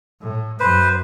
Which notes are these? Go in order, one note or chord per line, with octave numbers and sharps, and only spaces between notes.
A2
F#2 B4 C5